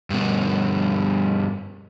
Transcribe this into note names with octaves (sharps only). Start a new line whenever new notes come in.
G2 B2